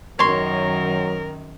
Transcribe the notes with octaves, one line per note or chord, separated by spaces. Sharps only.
F#2 D#3 F#3 A#4 C#5 C6